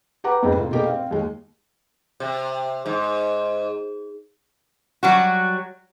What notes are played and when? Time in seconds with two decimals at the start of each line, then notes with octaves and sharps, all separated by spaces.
0.24 G4 B4 F#5 A#5 D6
0.43 F2 G#2 B3 C4
0.57 C3 A#3 F4
0.71 B2 A3 G4 G#4 A#4
0.86 C4 F5
1.11 D#2 G#3
2.20 C3
2.86 G#2
5.03 F#3 G3 F#4